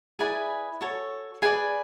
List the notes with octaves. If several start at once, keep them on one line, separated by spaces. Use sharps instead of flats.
E4 G#4 B4 D5 G#5
F#4 A4 C#5
G#4 B4 D5 G#5